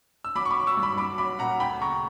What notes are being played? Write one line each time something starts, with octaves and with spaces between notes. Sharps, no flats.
E6
F#3 B5 D6
C#6
B5 D6
F#3
C#6 E6
G2
B5 D6
F#3 B5 D6
F#3 B5 D6
A#2 F#5 A#5
D2 G5 B5
C#3 A#5 C#6